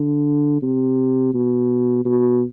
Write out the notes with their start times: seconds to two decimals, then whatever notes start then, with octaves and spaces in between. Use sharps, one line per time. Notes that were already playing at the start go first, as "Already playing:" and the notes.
Already playing: D3
0.62 C3
1.34 B2
2.05 B2